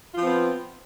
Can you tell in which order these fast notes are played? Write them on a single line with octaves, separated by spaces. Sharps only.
F4 F3 C4 B3